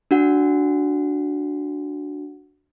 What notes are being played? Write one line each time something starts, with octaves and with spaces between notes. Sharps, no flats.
D4 F#4 F#5